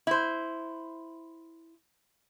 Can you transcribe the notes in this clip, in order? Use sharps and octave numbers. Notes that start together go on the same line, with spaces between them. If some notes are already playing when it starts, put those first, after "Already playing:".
E4 C5